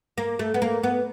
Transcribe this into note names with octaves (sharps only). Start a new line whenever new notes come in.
A#3
A3
B3
A#3
B3